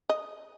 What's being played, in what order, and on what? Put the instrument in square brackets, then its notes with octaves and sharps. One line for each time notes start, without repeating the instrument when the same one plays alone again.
[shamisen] D#5